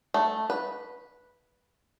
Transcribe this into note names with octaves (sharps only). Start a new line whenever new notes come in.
A3
B4